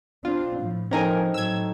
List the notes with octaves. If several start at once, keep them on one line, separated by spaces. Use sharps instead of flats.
C4 D4 F4
A2 F3
F3 C4 C#4 D#4 A4 A#4 G#5
A2 F#3 E6 G#6